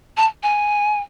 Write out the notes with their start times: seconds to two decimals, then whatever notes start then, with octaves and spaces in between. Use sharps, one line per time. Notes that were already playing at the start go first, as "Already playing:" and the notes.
0.17 A5
0.43 G#5